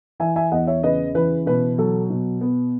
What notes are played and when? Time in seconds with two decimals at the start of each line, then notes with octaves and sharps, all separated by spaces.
0.20 E3 E5 G#5
0.36 E5 G#5
0.51 E2 D#5 F#5
0.67 C#5 E5
0.83 C#3 B4 D#5
1.15 E3 B4
1.46 B2 B4
1.78 F#3 A4
2.10 B2
2.41 B3